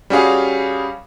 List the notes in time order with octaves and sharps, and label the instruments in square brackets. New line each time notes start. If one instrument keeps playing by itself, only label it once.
[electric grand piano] G3 C#4 F#4 G#4 F5